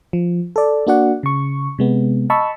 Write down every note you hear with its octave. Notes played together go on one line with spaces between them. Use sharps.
F3
A4 D5
A#3 D4 F#4 D5 F#5
C#3 C#6
C3 G#3 B3
D#5 A5 B5 C#6 E6